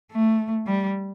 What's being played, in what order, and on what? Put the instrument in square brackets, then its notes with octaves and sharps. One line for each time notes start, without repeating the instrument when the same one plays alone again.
[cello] A3
G3